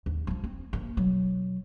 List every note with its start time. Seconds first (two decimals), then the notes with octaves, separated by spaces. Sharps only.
0.06 D#2
0.27 F3 A3
0.44 C4
0.73 F3 A#3
0.97 B2 F#3